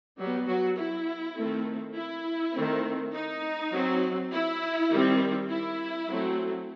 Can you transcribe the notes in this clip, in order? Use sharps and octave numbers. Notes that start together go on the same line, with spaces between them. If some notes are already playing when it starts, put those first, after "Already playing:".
F#3 G3 B3 G4
F#3 F#4
E4
D#3 A3 C4
E4
D#3 A3 C4
D#4
F#3 C4
E4
D#3 G3 C4
E4
F#3 A3 C4